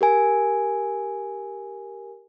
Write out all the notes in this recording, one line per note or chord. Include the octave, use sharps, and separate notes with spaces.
G4 A#4 G#5